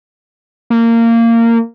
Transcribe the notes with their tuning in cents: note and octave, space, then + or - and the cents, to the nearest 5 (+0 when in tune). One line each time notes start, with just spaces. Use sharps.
A#3 -20